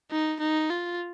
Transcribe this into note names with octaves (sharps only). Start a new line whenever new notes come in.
D#4
D#4
F4